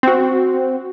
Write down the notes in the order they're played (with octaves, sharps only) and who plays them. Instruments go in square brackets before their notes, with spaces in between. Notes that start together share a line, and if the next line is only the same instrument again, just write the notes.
[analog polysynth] C4 F#4